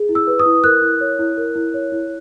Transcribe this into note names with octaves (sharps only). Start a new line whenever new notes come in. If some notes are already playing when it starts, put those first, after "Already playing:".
Already playing: G#4
E4
E6
B4
D#6
E4
A#4 F#6
E4
C#5
E4
A#4
E4
C#5
E4